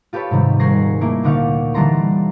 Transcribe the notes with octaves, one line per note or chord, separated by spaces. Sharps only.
F4 G4 A4 B4 C#5
G#2 C3 D#3 G3
D#1 G#4 A#4 C#6 A#6 C7
A3 A#3 E4
D2 A#2 D3 D#4 F5 C#6
D3 E3 G3 A4 A#5 C6